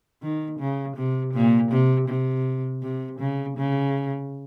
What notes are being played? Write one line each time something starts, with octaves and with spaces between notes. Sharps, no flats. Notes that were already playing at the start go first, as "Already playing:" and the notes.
D#3
C#3
C3
A#2
C3
C3
C3
C#3
C#3